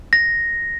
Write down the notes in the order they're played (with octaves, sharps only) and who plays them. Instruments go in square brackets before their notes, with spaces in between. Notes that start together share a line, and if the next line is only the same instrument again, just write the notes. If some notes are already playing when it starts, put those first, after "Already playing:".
[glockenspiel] A#6